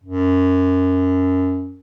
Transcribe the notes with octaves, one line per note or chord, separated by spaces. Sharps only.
F#2